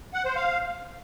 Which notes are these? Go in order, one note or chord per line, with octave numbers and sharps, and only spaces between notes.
F#5
C5
F5